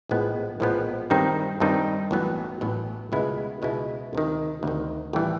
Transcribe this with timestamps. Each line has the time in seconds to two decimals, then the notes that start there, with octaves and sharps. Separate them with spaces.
0.09 A#1 A2 F3 G#3 B3
0.60 A#1 A2 F3 G#3 B3
1.10 G2 D#3 G3 C4 D#4
1.60 G2 D#3 G3 C4 D#4
2.11 A1 A2 F#3 B3
2.61 A1 A2 F#3 B3
3.12 C#2 B2 G#3 B3 E4
3.62 C#2 B2 G#3 B3 E4
4.13 D2 C3 D#3
4.63 D2 C3 D#3
5.13 A1 A2 E3 G3